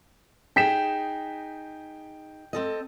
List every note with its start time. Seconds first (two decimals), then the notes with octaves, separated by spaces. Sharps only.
0.56 D#4 G#4 G5 B6 E7
2.53 C4 A4 D#5